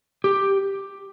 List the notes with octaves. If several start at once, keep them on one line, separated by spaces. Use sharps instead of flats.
G4